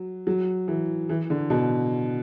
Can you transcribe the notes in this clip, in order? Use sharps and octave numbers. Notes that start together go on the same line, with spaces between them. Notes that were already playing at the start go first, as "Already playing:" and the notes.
Already playing: F#3
F#3
E3
E3
D3
B2